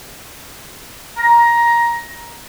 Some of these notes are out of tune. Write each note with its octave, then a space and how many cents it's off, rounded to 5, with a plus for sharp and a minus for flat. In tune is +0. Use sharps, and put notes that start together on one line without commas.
A#5 +15